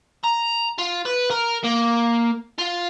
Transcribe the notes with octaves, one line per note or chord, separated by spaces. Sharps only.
A#5
F4
B4
A#4
A#3
F4